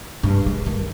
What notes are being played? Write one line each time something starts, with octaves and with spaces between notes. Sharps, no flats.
G2
G#3
D#3